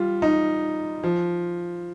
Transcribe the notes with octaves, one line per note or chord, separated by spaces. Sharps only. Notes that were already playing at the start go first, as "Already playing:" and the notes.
Already playing: G3 F4
D#4
F3